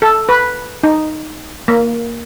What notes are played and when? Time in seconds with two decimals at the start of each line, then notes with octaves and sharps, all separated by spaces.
0.02 A4
0.29 B4
0.83 D#4
1.68 A#3